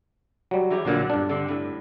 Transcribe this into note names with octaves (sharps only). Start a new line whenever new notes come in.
F#3 G3
E3 G4 G#4
A#1 A#2 D3 F#3 C4
G2 B3 D4
D3 C4
A2 G3